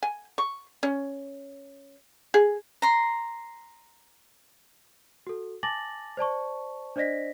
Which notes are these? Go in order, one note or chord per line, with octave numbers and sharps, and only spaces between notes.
G#5
C#6
C#4
G#4
A#5 C6
F#4 A4
G#5 A5 D6 A6 A#6 F#7
C5 D5 A5 C#6
D4 C5 D5 D#5 A#6 B6